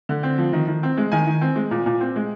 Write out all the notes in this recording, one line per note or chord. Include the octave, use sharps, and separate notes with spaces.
D3
C4
F3
D#3
D#3
C4
G#3
D#3 G#5
D#3
C4
G#3
A#2
A#2
C4
G#3